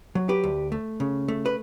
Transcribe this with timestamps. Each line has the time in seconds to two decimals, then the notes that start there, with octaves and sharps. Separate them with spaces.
0.15 F#3
0.29 G4 B4
0.44 D2
0.72 A3
1.00 C#3
1.28 A3
1.46 B4